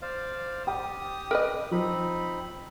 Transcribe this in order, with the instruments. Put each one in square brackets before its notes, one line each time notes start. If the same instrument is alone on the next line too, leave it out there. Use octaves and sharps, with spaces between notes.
[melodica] C5 D5 F5
[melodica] G4 D#6 [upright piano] G5
[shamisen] A#4 B4 D#5
[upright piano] F3 [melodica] C4 D#4 B5